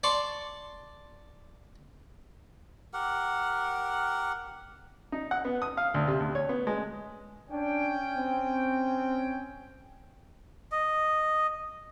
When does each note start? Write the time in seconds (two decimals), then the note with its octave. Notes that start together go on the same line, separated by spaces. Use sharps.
0.03 D5 A5 C6 C#6
2.93 G4 A#4 F#5
5.12 D#4
5.31 F#5
5.45 B3
5.62 D#6
5.77 F5
5.94 D2
6.08 C3
6.20 D2
6.35 C#5
6.49 B3
6.67 G#3
7.50 C#4 D4 G5
8.17 C4
10.72 D#5